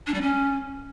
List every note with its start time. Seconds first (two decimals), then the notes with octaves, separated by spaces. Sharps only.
0.06 D4
0.14 G3
0.21 C#4